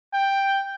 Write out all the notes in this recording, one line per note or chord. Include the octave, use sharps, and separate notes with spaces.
G5